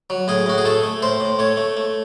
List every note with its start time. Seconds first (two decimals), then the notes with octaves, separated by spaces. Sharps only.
0.10 F#3
0.28 A2 G#4
0.46 A2 F#4
0.58 G#4
0.65 A3 A4
0.83 A3
1.02 A2 C5
1.20 A2
1.39 A3 C#5
1.57 A3
1.77 A3